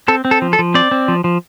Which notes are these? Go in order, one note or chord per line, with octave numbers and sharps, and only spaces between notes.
C4 A4
C4
A4
F3
A4
F3
C4 D5
C4
F3
F3